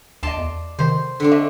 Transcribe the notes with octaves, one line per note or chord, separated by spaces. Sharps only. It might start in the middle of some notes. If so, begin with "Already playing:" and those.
D2 D5 D#5 A5 C6
E2
C3 D#3 C5
D3 C4 D4
D#5 E5 C#6